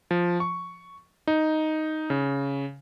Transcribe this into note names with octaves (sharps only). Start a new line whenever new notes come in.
F3
C#6
D#4
C#3